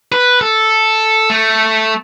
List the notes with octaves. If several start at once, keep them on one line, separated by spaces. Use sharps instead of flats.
B4
A4
A3